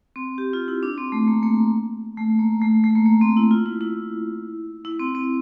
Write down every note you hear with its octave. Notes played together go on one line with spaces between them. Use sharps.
C4
G4
F4
E4
D4
C4
A3
A#3
A#3
A3
A#3
A3
A3
A#3
A#3
C4
E4
F4
E4
E4
E4
C4
C4